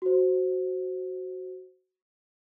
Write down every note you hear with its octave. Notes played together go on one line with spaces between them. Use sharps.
F#4 C5